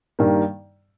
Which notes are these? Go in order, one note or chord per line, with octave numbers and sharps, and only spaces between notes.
G2 D#3 G3 A#3